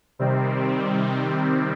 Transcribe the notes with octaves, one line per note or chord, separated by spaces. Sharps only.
C3 D#3 G3 C4